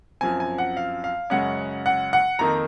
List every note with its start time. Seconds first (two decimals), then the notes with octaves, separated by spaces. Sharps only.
0.21 F#2 F3 C4 G#5
0.40 G#5
0.58 F#5
0.77 F5
1.04 F5
1.30 F#2 C#3 G#3 C#4 F#5
1.86 F#5
2.13 F#5
2.39 F2 D#3 A#3 D#4 A#5